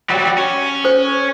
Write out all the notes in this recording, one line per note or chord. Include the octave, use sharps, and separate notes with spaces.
F#3 G3
C#4
A4 C5 G#5